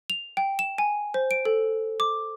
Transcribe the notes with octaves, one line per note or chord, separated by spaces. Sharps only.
F7
G5
E7
G#5
C5
D7
A4
D6